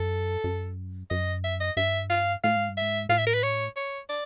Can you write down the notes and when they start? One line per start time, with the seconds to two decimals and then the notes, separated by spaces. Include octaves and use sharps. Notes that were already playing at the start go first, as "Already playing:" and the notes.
Already playing: F#2 A4
0.44 F#2
1.10 F#2 D#5
1.44 E5
1.60 D#5
1.77 G2 E5
2.10 F5
2.44 A2 F5
2.56 G#2
2.69 G2
2.77 G#2 E5
3.09 A2 F5
3.18 E5
3.27 A#4
3.34 B4
3.43 C#5
3.76 C#5
4.09 D5